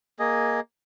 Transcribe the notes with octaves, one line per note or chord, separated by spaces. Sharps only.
A#3 G#4 D#5